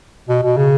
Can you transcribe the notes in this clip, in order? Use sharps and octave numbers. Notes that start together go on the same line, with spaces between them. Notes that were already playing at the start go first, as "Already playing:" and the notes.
B2
B2
C#3